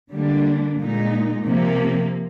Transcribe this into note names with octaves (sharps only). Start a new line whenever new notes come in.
D3 G3 A#3 D4
A#2 G#3 D#4
C3 F3 A#3